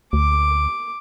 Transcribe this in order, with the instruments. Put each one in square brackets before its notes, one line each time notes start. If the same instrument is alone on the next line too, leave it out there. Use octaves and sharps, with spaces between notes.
[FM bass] D2 [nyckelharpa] D6